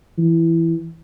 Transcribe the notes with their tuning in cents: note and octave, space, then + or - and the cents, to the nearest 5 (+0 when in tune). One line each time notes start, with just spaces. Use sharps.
E3 +5